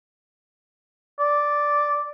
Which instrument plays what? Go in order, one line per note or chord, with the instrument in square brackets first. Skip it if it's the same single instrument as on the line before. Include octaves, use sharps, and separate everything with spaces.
[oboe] D5